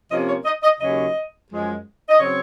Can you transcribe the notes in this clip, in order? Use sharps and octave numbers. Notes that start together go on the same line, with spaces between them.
C3 F3 A#3 C#4 D#5
C#5
D#5
D#5
D#2 C#3 F#3 C#4 D#5
F#2 F3 G#3
D#5
C#3 F#3 C4 C#5